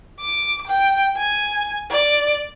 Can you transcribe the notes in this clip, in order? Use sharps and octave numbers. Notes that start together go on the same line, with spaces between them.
D6
G5
G#5
D5